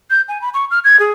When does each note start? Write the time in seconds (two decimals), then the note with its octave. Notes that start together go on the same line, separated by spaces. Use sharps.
0.10 G6
0.28 G#5
0.42 B5
0.54 C#6
0.71 F6
0.84 G#6
1.00 G#4